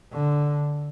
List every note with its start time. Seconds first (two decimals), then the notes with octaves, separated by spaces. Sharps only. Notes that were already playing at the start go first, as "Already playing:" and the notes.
0.13 D3